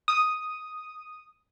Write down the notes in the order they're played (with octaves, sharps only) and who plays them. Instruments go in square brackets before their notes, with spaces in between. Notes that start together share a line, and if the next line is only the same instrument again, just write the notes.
[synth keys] D#6